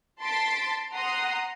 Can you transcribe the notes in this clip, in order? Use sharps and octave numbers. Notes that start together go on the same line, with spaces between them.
A5 C6 A6 B6 D7
F#5 A#5 C6 D#6